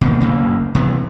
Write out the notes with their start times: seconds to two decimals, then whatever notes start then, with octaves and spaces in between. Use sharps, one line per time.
0.01 B2 D#3 A#3
0.20 F#1 D2 C#3 A#3
0.75 C3 E3 B3